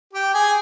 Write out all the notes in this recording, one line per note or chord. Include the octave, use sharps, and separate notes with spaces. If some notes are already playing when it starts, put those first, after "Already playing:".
G4 G5
G#4 G#5